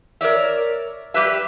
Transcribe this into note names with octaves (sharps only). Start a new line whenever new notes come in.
A#4 C#5 D5 E5
G3 G4 B4 E5